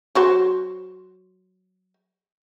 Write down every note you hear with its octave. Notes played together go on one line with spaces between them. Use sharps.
F#3 F#4 C5